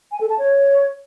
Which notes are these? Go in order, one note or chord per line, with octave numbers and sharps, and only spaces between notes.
G#5
A4
A5
C#5